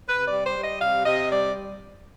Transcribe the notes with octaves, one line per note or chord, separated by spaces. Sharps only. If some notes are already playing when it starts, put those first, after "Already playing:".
C3 B4
D5
G3
C5
G3
D#5
C3 F5
C3 D#5
G3 D5